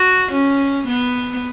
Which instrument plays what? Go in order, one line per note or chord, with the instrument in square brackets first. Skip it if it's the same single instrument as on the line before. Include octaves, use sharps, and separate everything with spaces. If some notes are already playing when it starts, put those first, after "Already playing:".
Already playing: [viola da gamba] F#4
C#4
B3